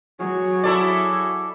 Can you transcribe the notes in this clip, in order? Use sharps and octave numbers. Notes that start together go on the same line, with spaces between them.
F#3 F#4 G#4 C#5
E4 A4 D5